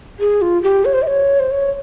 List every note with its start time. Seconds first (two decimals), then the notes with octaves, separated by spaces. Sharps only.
0.20 G#4
0.42 F4
0.63 G4
0.85 C#5
0.93 C5
1.02 E5
1.07 C#5
1.39 C5
1.51 C#5